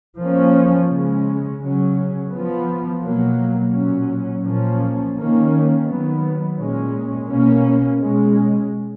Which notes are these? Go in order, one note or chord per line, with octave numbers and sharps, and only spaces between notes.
F3 A#3 C#4
C#3 G#3 C#4
C#3 F#3 C#4
F3 B3
B2 F#3 A#3
A#2 F#3 C#4
A#2 F3 A#3 C#4
D#3 A#3 C#4
D#3 F#3 B3
A#2 G#3 C#4
B2 A#3 C#4
B2 G#3 C#4